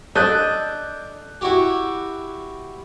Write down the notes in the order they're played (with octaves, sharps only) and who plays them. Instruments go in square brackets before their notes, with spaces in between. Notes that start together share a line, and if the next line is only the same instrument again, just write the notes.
[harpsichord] D4 [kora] A4 D#5 [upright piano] F#6 G6
[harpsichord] E4 F#4 G4